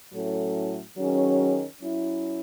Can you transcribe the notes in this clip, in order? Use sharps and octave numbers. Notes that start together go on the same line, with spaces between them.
A2 F#3 C#4 E4 A4
D#3 F#3 C#4 G#4
F#3 C#4 E4